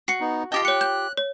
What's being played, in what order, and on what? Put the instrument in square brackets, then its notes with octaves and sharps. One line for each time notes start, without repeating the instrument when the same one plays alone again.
[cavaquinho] F#4 [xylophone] C7 C#7
[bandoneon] B3 D#4
[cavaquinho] F4 G4 G5 [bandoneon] D#5 A5
[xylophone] C#5 C#7 [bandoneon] F#6
[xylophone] G6
C#5